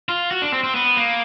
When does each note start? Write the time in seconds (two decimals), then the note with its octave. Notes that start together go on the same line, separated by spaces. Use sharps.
0.09 F4
0.31 F#4
0.42 D4
0.53 C4
0.64 C4
0.75 B3
0.96 A#3